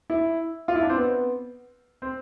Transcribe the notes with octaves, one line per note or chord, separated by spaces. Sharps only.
E4
F4
E4
D4
C4
B3
C4